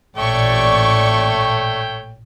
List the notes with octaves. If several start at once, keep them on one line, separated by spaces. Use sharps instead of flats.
A1 A#2 A3 C#5 D5 G5 C#6